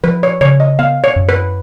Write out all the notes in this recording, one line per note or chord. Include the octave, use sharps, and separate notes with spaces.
F3 B4
C#5
C#3 C#5
D#5
B3 F5
C#5
F#2
B4